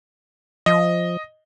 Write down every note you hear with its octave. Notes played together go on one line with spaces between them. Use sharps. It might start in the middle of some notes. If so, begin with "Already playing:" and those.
F3 D#5